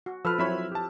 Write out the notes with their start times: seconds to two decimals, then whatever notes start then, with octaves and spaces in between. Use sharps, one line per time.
0.06 F#4
0.25 F3 A4 B4 E6 F6
0.38 F#3 C4 E4 C#5 E5 B5
0.72 G4 A5